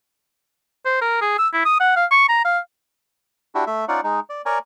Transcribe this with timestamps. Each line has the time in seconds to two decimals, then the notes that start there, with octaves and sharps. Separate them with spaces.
0.85 C5
1.01 A#4
1.21 G#4
1.38 E6
1.53 E4
1.65 D#6
1.80 F#5
1.96 F5
2.11 C#6
2.29 A#5
2.45 F5
3.55 D4 E4 F#4 G4
3.67 A3 E5
3.88 C#4 D#4 F4 D5 F#5
4.04 G#3 D#4
4.30 D5
4.46 A#4 C#5 D5 G#5 A#5